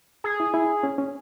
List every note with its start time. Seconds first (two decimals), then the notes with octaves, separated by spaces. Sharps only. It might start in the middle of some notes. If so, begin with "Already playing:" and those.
0.24 G#4
0.40 E4
0.54 E4
0.83 C#4
0.98 C#4